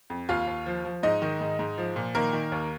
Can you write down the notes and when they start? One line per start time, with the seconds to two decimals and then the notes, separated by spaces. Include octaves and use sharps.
0.10 F2
0.29 D#2 F4 F5
0.47 D#2
0.66 F3
0.85 F3
1.03 G#2 D#4 D#5
1.22 D#3
1.41 G#2
1.59 G#2
1.78 F3
1.96 A#2
2.15 D#3 A#3 A#4
2.33 D#3
2.52 D#2